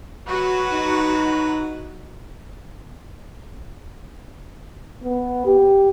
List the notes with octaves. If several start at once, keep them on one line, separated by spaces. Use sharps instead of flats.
F#3 F#4 B4
D#4
B3
G4